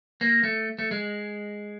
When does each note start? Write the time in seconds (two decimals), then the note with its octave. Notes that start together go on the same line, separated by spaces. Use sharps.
0.21 A#3
0.44 A3
0.79 A3
0.91 G#3